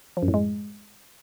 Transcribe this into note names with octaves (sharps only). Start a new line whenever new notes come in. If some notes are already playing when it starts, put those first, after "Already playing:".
F3
F#2
A2
G#3